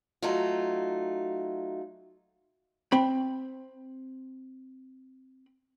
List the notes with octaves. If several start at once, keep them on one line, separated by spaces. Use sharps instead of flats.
F#3 A3 D#4 F4
C4 B5